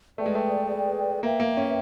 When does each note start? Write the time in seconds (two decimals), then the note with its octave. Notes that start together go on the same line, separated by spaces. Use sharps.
0.18 A3 G#4 B4 D5 G5
0.26 G#3
0.35 A3
1.22 A#3 B4 E5 G5
1.40 A#3
1.57 C#4